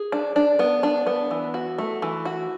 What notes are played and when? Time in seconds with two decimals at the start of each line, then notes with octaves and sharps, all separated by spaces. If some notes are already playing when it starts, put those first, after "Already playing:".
Already playing: G#4
0.12 D4
0.36 D4
0.59 B3
0.83 D4
1.07 B3
1.31 E3
1.54 F#4
1.78 A3
2.02 E3
2.25 F#4